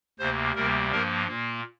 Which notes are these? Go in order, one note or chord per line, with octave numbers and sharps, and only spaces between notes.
D2 C3 A#3 C5
D2 C3 G3 A#3 A#4
G2 F3 A#3 A#4
A#2 A#3